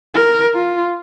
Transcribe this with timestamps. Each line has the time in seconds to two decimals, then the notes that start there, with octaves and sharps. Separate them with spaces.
0.15 A#4
0.55 F4